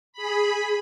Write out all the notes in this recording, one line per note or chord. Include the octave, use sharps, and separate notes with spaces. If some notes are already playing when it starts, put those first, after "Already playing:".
G#4 B5